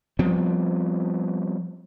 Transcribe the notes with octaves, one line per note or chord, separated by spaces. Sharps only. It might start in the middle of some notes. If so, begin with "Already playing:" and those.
F3 G3 B3 C4